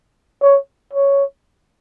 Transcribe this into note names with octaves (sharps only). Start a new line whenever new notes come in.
C#5
C#5